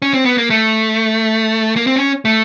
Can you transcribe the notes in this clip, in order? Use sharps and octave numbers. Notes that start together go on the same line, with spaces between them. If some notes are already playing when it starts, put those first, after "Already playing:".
C#4
C4
B3
A#3
A3
A#3
C4
C#4
A3